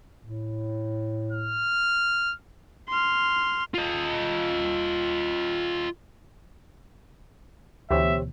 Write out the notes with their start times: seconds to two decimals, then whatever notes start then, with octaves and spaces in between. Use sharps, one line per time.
0.22 A2
1.32 F6
2.89 C6 F6
3.75 F4 D#5
7.91 D2 B2 E3 G4 C5 C#5 E5